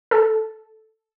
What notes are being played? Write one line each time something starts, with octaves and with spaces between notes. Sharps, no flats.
A4